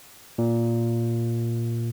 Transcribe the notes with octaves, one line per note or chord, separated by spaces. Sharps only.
A#2